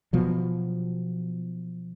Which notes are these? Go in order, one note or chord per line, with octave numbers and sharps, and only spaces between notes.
B2 F3 F#3